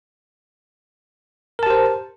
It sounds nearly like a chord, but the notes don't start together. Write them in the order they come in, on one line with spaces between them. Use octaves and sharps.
A#4 A5 G4 C5